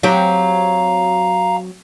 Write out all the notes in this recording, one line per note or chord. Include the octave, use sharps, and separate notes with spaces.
F#3 C4 G4 F5 A#5